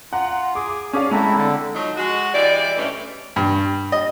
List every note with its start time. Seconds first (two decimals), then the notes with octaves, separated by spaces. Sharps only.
0.13 F4 F#5 A#5
0.55 G#4 D6
0.93 C#4 G#4 D5 F5
1.11 G#3 A3 C4 E4 A4 A#5
1.36 D3
1.75 F3 F#3 D#4
1.96 G#3 F#4
2.33 E3 G3 G#3 D5
2.76 G2 E3 G#3 A3 C#4
3.36 G2
3.92 D#5